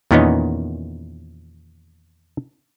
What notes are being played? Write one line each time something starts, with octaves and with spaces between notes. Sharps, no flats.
E2 A#2 D#3 B3 C#4 D#4